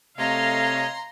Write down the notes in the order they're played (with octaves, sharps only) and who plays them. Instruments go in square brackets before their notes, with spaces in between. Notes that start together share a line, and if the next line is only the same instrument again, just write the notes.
[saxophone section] C3 A3 [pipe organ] C#5 D#5 [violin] F5 [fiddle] A#5 C6